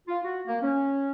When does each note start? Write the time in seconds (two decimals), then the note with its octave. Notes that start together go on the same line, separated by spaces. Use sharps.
0.08 F4
0.24 F#4
0.46 A#3
0.62 C#4